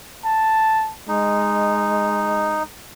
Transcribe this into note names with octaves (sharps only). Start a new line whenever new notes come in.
A5
G#3 D#4